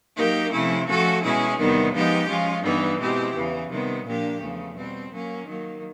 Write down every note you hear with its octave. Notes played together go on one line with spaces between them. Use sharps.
F#3 A#3 D#4 G4 A#4
C3 F3 A3 C#4 E4
F3 A3 C#4 F#4 A4
B2 G#3 C#4 E4 G#4
E2 C3 D#3 G3 B3
F3 G#3 B3 D#4 G4
F3 G#3 C#4 F4
G2 E3 G3 B3 D#4
B2 G#3 C4 E4 G4
E2 C#3 E3
C3 D#3 G3 B3
A#2 F3 A#3 D4 G4
E2 C#3 F3 A3
B2 G3 C4
F#3 A#3 C#4
D#3 F#3 A#3